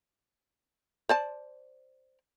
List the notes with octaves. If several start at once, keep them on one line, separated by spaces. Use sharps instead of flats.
C5 D5 A5